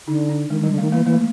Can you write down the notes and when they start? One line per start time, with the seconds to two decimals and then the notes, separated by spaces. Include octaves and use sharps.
0.08 D3 D#4
0.29 D4
0.50 D#3 G#3
0.61 D#3 G3
0.71 D3
0.78 D#3 A3
0.92 E3 A#3
1.05 E3 A#3
1.13 A3